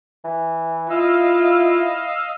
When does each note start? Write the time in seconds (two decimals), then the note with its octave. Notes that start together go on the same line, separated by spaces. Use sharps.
0.24 E3
0.90 E4 F4 D#5 F5 E6